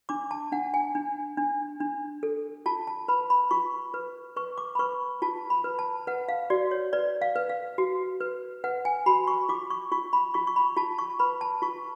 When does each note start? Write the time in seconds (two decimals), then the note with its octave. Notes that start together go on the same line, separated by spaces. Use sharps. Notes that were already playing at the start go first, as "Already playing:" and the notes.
0.09 D4 D6
0.31 A5
0.52 D4 F#5
0.74 G#5
0.95 D4
1.38 D4
1.80 D4
2.23 A4
2.66 F4 A5
2.87 A5
3.08 B4 B5
3.30 B5
3.51 F4 C#6
3.94 B4
4.37 B4 C#6
4.58 D6
4.75 B5
4.79 B4 C#6
5.22 F4 A5
5.50 B5
5.64 B4
5.79 A5
6.07 B4 F#5
6.29 F5
6.50 F#4 D5
6.71 C#5
6.93 B4 D5
7.22 F5
7.36 B4
7.49 F5
7.78 F#4
8.21 B4
8.64 B4 F#5
8.85 G#5
9.06 F#4 B5
9.27 C#6
9.49 F4 D6
9.71 C#6
9.92 F4 C#6
10.13 B5
10.34 F4 C#6
10.47 C#6
10.56 B5
10.77 F4 A5
10.98 C#6
11.19 B4 B5
11.41 A5
11.62 F4 C#6